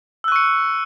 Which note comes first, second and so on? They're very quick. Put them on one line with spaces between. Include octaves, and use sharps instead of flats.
E6 F#6 C#6 C#7